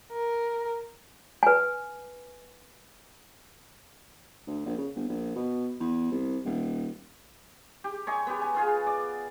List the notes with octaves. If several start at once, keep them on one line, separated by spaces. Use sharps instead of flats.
A#4
B4 G#5
D2
A#1
C#3
G1
A#1
B2
E2
C2
D#1
G4
C#5 D#5 G#5 C6
B3 G4
G#5
B3 F4 G#4
D5